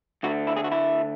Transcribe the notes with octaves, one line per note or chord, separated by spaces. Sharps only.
D2 D3 A3 F#4
E4
G#4
F#4
E4